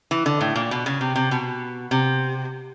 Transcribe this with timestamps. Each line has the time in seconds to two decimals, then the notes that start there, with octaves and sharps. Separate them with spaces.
0.11 E3
0.26 D3
0.41 A2
0.56 A#2
0.71 B2
0.86 C#3
1.01 C3
1.16 C3
1.31 B2
1.91 C3